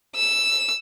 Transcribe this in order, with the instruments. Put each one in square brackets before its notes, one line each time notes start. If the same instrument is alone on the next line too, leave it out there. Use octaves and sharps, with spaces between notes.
[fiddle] E6